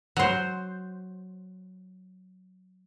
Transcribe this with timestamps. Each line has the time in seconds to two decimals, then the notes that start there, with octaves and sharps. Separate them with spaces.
0.16 F#3 C5